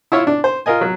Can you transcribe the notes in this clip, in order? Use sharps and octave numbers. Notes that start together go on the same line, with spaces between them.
E4 F4 C#5 E5
D4
C5
F4 A#4 D#5 G#5
F#3